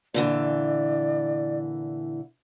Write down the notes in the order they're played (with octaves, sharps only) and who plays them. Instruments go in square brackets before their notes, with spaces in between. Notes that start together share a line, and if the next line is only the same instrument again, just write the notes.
[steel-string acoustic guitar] A#2 D3 E3 [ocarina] D5